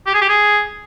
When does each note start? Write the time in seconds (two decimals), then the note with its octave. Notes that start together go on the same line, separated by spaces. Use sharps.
0.07 G4
0.14 G#4
0.21 G4
0.29 G#4